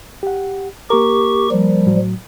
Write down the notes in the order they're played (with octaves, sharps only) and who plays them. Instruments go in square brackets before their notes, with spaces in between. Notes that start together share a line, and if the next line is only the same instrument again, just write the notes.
[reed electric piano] G4 F#5
[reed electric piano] A#3 A#4 [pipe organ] G4 C#6
[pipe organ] F3 G3
[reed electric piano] A2 F#3